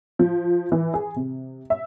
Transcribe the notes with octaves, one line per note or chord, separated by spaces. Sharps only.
F3
E3
G#4
C3
E5